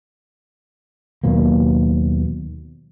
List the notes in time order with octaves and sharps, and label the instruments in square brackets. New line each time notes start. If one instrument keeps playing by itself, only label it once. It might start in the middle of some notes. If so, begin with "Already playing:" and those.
[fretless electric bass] D#2 B2 F#3 A#3